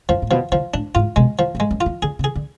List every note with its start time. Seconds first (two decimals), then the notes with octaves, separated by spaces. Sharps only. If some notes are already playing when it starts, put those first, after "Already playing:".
0.09 F#2 F3
0.22 A2
0.31 B2 F3
0.52 D3 F3
0.74 A2 D4
0.95 G#2 F4
1.16 B2 G#3
1.39 F3
1.55 G#2
1.60 G#3
1.71 F#2
1.81 F4
1.86 F3
2.02 D3 G#4
2.19 C#3
2.24 G#4
2.35 D3